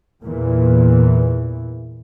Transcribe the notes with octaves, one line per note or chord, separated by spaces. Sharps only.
E2 A#2 E3